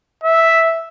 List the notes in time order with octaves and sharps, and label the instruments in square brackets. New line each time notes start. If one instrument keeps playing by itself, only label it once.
[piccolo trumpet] E5